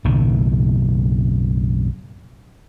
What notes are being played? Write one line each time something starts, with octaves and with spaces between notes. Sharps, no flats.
F#1 B1 A2 D#3